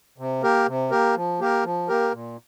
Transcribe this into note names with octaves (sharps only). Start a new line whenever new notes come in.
C3
A#3 G4 A#4
C3
A#3 G4 A#4
F3
A#3 G4 A#4
F3
A#3 G4 A#4
A#2